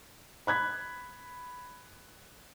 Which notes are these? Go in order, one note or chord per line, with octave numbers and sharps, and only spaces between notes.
B5 F#6 G#6 B6